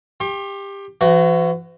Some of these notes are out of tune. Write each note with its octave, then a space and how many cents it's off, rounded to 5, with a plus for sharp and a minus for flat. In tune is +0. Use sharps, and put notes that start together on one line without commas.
G4 +20 C6 +45
E3 +45 F#4 +0 B4 +45